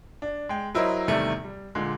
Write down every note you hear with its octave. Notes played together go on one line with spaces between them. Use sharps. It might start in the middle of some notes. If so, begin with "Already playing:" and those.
D4
G#3 G5
F#3 E4 A#4 C5 D#5
E2 C3 D#3 G3 A3
G3
A#2 D3 G#3